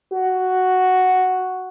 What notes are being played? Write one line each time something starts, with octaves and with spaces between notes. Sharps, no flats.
F#4